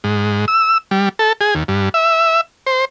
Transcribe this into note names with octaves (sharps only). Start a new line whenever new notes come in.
G#2
E6
G3
A4
G#4
D#2
G2
E5
C5